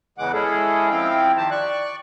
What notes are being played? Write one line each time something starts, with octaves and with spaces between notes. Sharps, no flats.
E2 C#3 E3 G#3 F#5 D6
G#3 C#4 E4 G#4 A4
F3 C4 E4 F5 G5
D#3 G4 C5 A5
D5 C#6 F#6